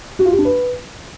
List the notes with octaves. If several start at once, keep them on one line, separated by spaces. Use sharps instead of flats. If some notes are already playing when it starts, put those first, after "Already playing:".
F#4
F4
G4
D4
B4